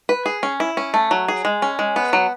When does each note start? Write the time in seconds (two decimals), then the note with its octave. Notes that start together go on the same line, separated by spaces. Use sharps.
0.09 B4
0.26 G#4
0.43 C#4
0.60 E4
0.77 C#4
0.94 A3
1.11 F#3
1.28 G#4
1.45 G#3
1.62 C#4
1.79 G#3
1.96 B3
2.13 F#3